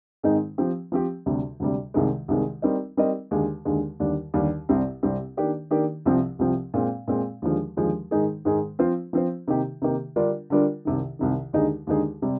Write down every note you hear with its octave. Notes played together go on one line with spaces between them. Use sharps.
G#2 D#3 G#3 C4 D#4
F3 C4 G4
F3 C4 G4
D2 C3 G3
D2 C3 G3
C2 C3 D#3 G#3
C2 C3 D#3 G#3
G3 C4 D#4 A#4 D#5
G3 C4 D#4 A#4 D#5
D#2 D3 G#3
D#2 D3 G#3
D#2 D3 G3 D4
D#2 D3 G3 D4
C2 C3 G3 C4 G4
C2 C3 G3 C4 G4
D#3 A#3 D4 G4 D5
D#3 A#3 D4 G4 D5
C2 C3 F3 C4 G4
C2 C3 F3 C4 G4
A#2 G#3 C4
A#2 G#3 C4
D#2 D3 F3 G#3
D#2 D3 F3 G#3
G#2 D#3 G#3 D#4 G#4
G#2 D#3 G#3 D#4 G#4
F3 C4 F4 C5
F3 C4 F4 C5
C3 D#3 A#3 D#4 G4
C3 D#3 A#3 D#4 G4
D3 G3 D4 F4 A#4
D3 G3 D4 F4 A#4
C2 C3 D#3
C2 C3 D#3
D#2 D3 G#3 D#4 G#4
D#2 D3 G#3 D#4 G#4
C3 G3